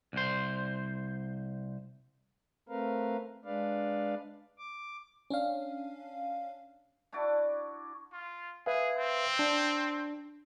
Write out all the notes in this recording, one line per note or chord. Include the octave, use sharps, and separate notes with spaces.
C2 C5
A3 C4 A#4 B4 F5
G#3 D4 B4 D5 F5
D6
C#4 D4 F5
D4 E4 F#4 D5
F4
G#4 B4 E5 F5
C4
D4